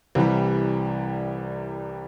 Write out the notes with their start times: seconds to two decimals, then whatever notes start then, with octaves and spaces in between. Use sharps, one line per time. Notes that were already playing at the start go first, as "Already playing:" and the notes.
0.15 C2 C3 E3 G3